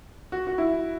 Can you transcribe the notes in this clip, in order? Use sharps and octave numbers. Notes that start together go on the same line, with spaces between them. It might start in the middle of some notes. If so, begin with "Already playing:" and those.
F#4
F#4
E4